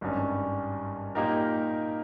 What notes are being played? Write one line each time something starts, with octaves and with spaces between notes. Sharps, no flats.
G#1 G2 G3 C#4
A#2 A#3 D#4 G4 A#4